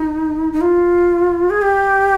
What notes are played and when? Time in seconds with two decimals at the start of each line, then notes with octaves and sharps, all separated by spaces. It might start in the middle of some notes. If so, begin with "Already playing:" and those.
Already playing: D#4
0.53 D#4
0.61 F4
1.50 G#4
1.62 G4